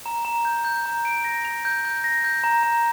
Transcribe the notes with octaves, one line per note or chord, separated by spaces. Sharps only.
A#5
A#5
G6
G6
A#5
D7
A#6
F7
G6
G6
A#6
G6
A#5
A#5